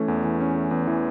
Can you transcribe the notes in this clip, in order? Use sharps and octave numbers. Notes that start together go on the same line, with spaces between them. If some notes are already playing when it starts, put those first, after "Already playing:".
Already playing: E3 A3 C#4
E2
E3
C#4
A3
E2
E3